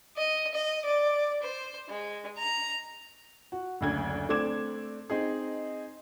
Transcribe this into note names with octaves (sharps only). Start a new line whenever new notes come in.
D#5
D#5
D5
C5
G#3
A#5
F#4
F#1 D2 G#6
A3 C4 D4 D6 G#6 E7
C4 D#4 G#4